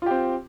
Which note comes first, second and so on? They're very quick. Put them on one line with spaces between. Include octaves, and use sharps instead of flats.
F4 G4 C4